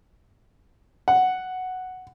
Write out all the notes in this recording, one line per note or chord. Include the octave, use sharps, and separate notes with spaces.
F#5